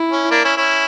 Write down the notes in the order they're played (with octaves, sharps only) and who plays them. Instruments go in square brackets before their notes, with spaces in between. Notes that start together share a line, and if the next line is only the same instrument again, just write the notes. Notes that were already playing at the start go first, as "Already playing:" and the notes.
Already playing: [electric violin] E4
[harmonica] C#4
A#3 D4
C#4 E4
C#4 E4